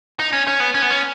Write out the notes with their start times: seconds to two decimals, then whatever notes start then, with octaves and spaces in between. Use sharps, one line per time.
0.20 D#4
0.33 C#4
0.47 C#4
0.60 B3
0.74 C#4
0.82 B3
0.90 C#4